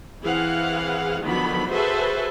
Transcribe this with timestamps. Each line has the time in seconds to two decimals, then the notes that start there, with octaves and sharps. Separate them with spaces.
0.23 E3 C4 E4 G#4 F5 F#5
1.22 D3 D#3 F3 F#3 B3 B5
1.71 F#4 G#4 A4 B4 C5 E5